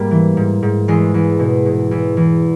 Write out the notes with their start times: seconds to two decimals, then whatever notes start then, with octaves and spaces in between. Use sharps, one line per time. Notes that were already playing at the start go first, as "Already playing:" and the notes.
Already playing: G#2 G3 A#3
0.11 E3
0.37 G#2
0.63 G#2
0.88 E2 G#3
1.14 E2
1.39 B2
1.66 B2
1.91 E2
2.17 E2